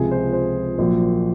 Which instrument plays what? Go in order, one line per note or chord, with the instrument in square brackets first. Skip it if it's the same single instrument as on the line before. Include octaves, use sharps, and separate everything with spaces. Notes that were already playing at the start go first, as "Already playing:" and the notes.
Already playing: [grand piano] C#2 C3 F3 G#4
C5
C5
A#1 A#2 F#3